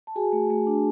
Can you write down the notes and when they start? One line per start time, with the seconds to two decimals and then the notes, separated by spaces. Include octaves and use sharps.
0.07 A5
0.16 F#4 G#4 G#5
0.33 A3
0.50 A3
0.67 D4